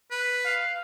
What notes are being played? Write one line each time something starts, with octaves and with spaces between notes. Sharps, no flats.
B4
F5